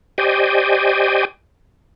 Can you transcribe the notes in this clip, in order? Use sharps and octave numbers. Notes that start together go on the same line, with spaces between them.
G4 C5 D5 D#5 G5 G#5